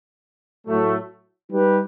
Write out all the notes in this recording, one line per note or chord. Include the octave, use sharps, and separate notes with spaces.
A2 F#3 A3
G3 D#4 G4 B4